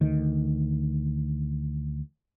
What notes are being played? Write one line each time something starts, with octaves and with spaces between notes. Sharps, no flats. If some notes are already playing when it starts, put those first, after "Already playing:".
D2 D#3